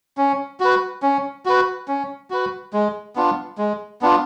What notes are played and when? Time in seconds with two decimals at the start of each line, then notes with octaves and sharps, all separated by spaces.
0.17 C#4
0.60 F#4 B4
1.02 C#4
1.45 F#4 B4
1.88 C#4
2.30 F#4 B4
2.73 G#3
3.16 B3 D4 F4
3.58 G#3
4.01 B3 D4 F4